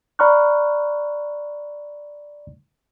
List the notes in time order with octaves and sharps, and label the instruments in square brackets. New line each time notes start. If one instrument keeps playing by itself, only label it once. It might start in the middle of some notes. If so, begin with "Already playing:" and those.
[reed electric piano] D5 A#5 B5 C#6 F6 F#6